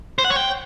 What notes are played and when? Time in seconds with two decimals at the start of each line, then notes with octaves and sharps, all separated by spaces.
0.19 C5
0.24 F#5
0.30 C#5
0.36 G5